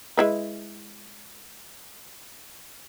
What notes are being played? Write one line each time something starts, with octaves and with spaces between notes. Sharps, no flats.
G#3 E4 B4